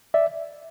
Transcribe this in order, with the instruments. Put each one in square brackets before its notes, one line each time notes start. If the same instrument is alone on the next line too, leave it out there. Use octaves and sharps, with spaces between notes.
[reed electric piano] D5 E5